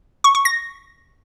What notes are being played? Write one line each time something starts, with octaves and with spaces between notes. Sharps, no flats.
C#6
C#6
A#6